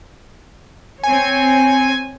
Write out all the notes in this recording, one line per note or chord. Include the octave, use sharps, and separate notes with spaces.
C4 C#5 G#5